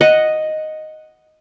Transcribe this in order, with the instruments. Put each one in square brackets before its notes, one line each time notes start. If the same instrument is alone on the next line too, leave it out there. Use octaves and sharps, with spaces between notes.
[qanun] D#5 F#5